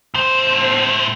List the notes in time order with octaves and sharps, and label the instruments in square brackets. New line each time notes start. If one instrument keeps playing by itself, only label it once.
[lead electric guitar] A2 C5